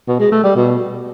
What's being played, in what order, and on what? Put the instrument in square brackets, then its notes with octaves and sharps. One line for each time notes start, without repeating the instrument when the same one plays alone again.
[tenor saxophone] B2
G#3
A3
G3
B2